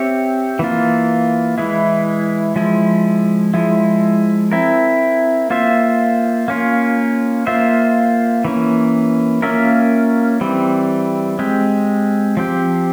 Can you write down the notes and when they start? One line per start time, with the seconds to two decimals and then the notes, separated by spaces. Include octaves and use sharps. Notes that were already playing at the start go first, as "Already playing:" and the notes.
Already playing: C4 G4 C#5 E5
0.59 E3 A#3 F4
1.58 E3 G#3 E4
2.56 F3 G#3 E4
3.54 F3 G#3 E4
4.52 C4 E4 A#4
5.50 A#3 F4 C5 E5
6.48 A#3 C#4 F4
7.47 A#3 F4 C5 E5
8.45 E3 A#3 C#4
9.42 A#3 C#4 F4 A#4 E5
10.41 E3 G3 C4
11.39 G#3 C4 G4
12.37 F3 C4 G4